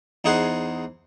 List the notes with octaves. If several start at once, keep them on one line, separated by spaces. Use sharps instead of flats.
E2 D#4 G#4 C5 F#5